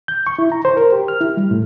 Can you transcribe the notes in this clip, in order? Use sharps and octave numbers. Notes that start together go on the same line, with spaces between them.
G6
C#6
E4
A#5
C5
A#4
G4
F6
E4
G3
A2